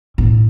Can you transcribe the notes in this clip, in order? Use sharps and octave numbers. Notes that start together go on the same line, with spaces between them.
A2